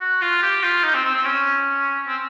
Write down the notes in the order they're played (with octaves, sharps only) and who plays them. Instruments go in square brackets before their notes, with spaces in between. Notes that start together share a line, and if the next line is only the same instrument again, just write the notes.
[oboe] F#4
F4
G4
F4
D#4
C4
C4
C4
C#4
C4